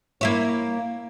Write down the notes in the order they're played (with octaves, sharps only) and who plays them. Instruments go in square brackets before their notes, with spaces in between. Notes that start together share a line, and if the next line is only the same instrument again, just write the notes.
[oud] A#3 E4 C#5